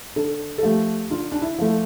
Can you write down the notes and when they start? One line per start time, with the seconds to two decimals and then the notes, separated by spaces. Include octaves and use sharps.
0.16 D3 A4
0.58 A4
0.62 F3 A3 G4
1.10 D3 F4
1.32 D4
1.42 E4
1.58 F3 A3